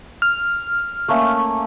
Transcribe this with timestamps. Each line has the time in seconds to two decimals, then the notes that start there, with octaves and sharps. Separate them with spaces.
0.22 F6
1.08 A3 A#3 C#4